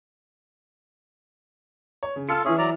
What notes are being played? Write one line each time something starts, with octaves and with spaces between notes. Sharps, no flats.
C#5
C#3
F4 A4 E6 F6 C#7
E3 C#4 E4 G#4 E5
F#3 D5 A#5